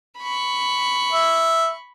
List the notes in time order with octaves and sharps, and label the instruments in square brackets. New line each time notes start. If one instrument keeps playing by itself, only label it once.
[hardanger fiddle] B5 C#6
[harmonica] E5